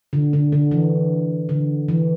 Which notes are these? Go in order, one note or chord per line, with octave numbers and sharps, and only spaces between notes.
D3
D3
D3
E3
D3
E3